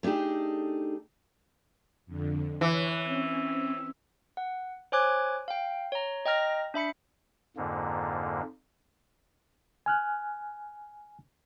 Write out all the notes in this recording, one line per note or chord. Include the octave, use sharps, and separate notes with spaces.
A3 D4 D#4 G4 G#4
F2 D3
E3 C#5 F#6
C4 C#4
F#5
C5 C#5 G#5 D6 F#6 G#6
F5 G5
C#5 A#5
D#5 G5 A#5 F6 A#6
D4 E5 B5 C#7
F2 G#2 D3 A#3
G#5 F6 F#6